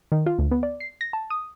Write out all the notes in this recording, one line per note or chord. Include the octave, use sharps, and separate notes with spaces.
D#3
F4
D2
B3
D5
C7
A#6
A5
D#6